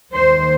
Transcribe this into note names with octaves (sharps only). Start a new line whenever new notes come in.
D#2 D#3 C5